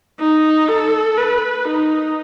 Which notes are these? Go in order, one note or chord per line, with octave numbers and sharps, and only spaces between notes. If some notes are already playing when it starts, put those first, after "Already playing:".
D#4
A4
B4
D#4